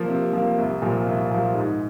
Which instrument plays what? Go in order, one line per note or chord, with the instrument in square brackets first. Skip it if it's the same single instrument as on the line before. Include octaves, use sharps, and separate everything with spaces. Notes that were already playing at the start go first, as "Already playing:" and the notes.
Already playing: [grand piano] F3 A#3
C3
F3 A#3
C2
A#2 F3
C2
A#2 F3
G#2